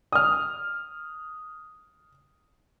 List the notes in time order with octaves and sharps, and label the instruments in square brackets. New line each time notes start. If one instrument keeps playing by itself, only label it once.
[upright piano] D#6 F6